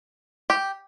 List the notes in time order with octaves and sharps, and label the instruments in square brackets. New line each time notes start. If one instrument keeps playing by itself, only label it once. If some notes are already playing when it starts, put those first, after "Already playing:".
[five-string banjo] G4